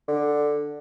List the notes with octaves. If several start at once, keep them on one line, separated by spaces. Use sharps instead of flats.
D3